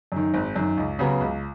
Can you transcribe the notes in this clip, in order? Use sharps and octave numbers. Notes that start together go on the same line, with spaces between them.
F#2 D#3
G#1
F#2 D#3
C#2
C#3 F#3 B3
C#2